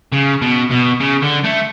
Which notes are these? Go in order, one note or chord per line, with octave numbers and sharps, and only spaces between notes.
C#3
B2
B2
C#3
D3
A3